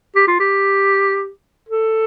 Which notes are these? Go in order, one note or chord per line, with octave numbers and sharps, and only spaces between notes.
G4
F4
G4
A4